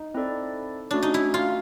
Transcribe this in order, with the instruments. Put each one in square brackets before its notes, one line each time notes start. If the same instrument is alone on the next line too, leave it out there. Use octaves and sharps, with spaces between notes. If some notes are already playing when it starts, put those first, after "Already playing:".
Already playing: [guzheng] D#4
[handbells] C4 E4 A4 D5
[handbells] A3 C#4 F#4 [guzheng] D4
[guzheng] D#4
E4
F4